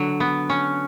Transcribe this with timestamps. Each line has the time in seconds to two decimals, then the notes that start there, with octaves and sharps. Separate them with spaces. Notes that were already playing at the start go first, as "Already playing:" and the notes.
Already playing: D3 F#3
0.20 B3
0.50 C#4